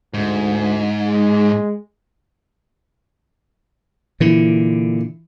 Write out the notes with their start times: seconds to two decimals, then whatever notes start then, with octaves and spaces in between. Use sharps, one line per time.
0.14 D2 G#2
1.05 G#3
4.20 A#2 D3 E3